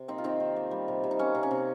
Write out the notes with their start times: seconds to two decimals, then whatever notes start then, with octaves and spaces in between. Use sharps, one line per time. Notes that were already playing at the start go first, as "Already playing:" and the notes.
Already playing: C3
0.08 A#3 C4 D#4
0.18 F4
0.24 D#3 C4 D#4
0.40 D#3
0.56 A#3
0.71 G3
0.88 C3
1.04 C3
1.11 D#4
1.19 A#3 C#4
1.35 C3
1.43 C#4
1.51 C3